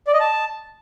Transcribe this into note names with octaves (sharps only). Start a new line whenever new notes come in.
D5
D#5
A5